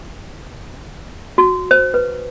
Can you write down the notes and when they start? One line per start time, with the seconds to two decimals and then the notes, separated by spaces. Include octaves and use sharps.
1.38 F#4
1.71 C5
1.94 B4